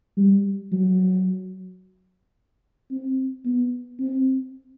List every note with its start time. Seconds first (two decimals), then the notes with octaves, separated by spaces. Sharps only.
0.17 G3
0.72 F#3
2.91 C4
3.45 B3
4.00 C4